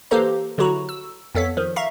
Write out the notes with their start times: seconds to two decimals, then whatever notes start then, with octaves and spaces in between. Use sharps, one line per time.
0.11 E3 A#3 G4 A4 C5 A#5
0.58 D3 F#3 E4 F#4 A#5
0.89 E6
1.35 F2 B3 A4 C#5 B6
1.57 D#3 F3
1.76 E5 F5 A#5 C#6